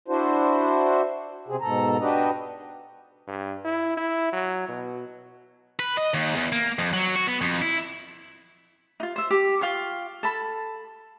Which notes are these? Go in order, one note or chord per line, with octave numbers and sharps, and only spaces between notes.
D4 E4 F#4 C5
C3 C4 G#4
G#2 B2 A4 A#5
D4 F#4 G4 B4 D#5
G2
E4
E4
F#3
B2
B4
D#5
D#2
E2
A#3
F2
F#3
F#4
B3
F2
E4
D#4 F4
C5 E5
G4
F4 F5 G5 C#6
A4 A5 B5